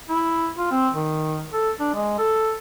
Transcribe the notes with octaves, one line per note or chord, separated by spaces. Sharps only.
E4
F4
C4
D#3
A4
D4
G#3
A4